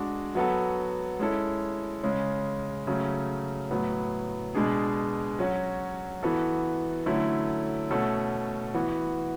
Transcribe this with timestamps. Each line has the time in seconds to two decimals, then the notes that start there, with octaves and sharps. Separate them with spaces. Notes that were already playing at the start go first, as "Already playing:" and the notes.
Already playing: G#3 D4 F#4
0.35 F#3 B3 F#4 A4
1.19 G#3 C#4 E4 A4
2.03 C#3 G#3 C#4
2.87 C#3 F#3 A3 C#4
3.71 A2 F#3 B3
4.55 B2 G#3 D4 G#4
5.39 F#3 C#4 F#4
6.23 E3 B3 F#4 A4
7.06 D3 F#3 A3 C#4 E4
7.90 B2 A3 C#4 F#4 A4
8.74 E3 B3 F#4